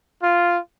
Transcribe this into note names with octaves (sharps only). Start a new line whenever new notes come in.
F4